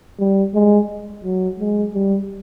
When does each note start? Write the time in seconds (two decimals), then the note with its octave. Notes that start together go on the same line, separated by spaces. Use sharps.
0.19 G3
0.54 G#3
1.24 F#3
1.59 G#3
1.94 G3